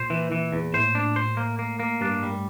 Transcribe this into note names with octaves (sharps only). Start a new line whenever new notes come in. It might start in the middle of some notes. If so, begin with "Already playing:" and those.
Already playing: A#2 C5
E3
E3
E2
A2 C5
D4
C5
A#3
A#3
A#3
G2 D4
G3